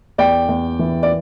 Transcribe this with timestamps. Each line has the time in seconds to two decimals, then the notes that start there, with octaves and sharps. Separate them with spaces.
0.18 E2 D5 G5
0.49 E2
0.79 E3
1.03 D5